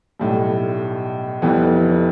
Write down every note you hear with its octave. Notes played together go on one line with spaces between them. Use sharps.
B1 A2 G3
F1 F2 E3 G3 B3